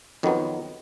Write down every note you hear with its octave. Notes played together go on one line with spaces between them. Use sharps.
F2 D#3 F#3 B3